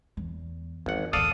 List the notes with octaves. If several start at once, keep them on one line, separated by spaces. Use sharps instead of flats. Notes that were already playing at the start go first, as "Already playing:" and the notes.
E2
G#1 E2 F#5
E2 A2 A4 D5 F5 D#6